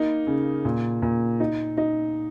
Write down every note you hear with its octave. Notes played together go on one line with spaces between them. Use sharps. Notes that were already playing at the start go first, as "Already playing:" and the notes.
Already playing: A#3 D#4
C#3
A#2
A#2
D#4
D#4